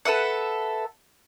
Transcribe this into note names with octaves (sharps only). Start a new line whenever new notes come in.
A4 B4 E5 F#5